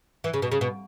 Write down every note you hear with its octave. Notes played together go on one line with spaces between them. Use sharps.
E3
C#3
B2
C#3
B2